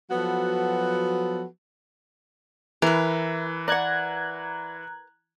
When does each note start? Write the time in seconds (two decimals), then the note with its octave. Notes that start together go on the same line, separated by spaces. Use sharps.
0.11 F3 F#3 B3 F#4 A4 B4
2.82 E3 E4 A#4 B4
3.68 D5 F#5 A#5 F#6 G#6